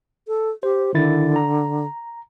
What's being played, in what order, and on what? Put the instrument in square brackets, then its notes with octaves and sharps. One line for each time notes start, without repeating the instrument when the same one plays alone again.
[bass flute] A4
[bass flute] G4 [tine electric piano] C5
[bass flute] D3 [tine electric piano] D#3 E4 A6
[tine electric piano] A#5